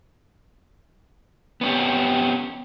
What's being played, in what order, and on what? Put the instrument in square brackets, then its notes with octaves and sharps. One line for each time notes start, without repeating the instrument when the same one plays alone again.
[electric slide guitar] B3 C#4 G4